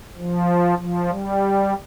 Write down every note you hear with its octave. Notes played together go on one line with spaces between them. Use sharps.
F3
F3
G3